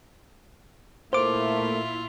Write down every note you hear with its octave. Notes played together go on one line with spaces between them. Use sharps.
A#2 A3 A#3 E4 F4 C5 D6